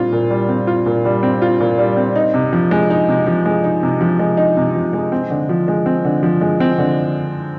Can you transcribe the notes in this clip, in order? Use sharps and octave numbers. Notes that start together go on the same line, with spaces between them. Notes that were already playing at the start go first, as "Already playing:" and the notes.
Already playing: A#2 G3 C4 F4
A#2
G3
C4
F4
A#2
G3
C4
F4
A#2
G3
C4
D#4
C3
F3
G#3
D#4
C3
F3
G#3
D#4
C3
F3
G#3
D#4
C3
F3
G#3
C4
D3
F3
G#3
C4
D3
F3
G#3
C4
D3